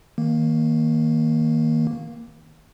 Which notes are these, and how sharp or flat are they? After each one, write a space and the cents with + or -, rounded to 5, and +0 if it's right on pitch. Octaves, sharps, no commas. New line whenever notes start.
D#3 +25 A#3 +0